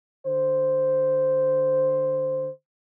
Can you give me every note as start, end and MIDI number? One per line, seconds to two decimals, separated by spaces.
0.25 2.49 50
0.25 2.49 72